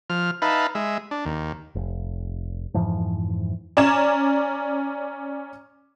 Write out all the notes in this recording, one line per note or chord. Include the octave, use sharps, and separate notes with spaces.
F3 F6
D#4 B4 E5 F5 A5 B5
G#3 E5
D4
D#2
F1
F2 G#2 E3 F3
C#4 D5 A#5 G#6 E7